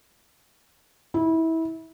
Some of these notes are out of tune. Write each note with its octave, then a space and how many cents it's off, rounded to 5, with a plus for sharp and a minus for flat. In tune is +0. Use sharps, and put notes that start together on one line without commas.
E4 -25